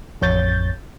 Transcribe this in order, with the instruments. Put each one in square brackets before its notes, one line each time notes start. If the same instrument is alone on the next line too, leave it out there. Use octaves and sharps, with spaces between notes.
[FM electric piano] A1 F2 C#5 G6 A6